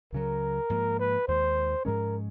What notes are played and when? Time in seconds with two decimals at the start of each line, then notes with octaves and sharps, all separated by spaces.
0.12 C#2 C#3 F#3 A#4
0.70 G#2 F3 A#3
0.99 B4
1.28 D#2 D#3 G#3 C5
1.85 G#2 F3 G#3 C#4 A#4